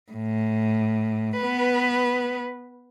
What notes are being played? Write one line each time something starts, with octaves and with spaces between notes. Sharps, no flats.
A2
B3 B4